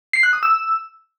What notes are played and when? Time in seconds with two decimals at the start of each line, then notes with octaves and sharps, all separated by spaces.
0.13 C7
0.23 F#6
0.33 D#6
0.43 E6